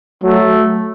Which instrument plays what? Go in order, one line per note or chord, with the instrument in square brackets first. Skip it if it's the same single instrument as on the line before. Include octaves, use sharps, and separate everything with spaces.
[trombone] F#3 [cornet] A3